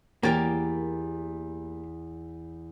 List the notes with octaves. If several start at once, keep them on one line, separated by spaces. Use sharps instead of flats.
E2 A#3 G4 A#4 A6